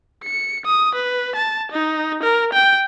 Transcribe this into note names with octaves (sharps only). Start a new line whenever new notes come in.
C#7
D#6
B4
A5
D#4
A#4
G5